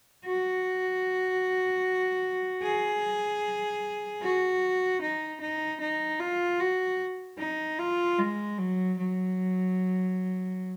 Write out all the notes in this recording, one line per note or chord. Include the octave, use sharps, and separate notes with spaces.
F#4
G#4
F#4
D#4
D#4
D#4
F4
F#4
D#4
F4
G#3
F#3
F#3